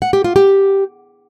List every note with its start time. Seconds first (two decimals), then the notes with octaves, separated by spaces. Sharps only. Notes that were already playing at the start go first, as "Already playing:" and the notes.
0.02 F#5
0.13 G4
0.24 F4
0.36 G4